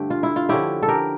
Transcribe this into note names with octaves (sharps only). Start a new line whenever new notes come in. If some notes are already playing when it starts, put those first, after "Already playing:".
Already playing: G2 D3 A3 G4
F4
E4
F4
D3 F3 C#4 E4 G4
A4
G4 A#4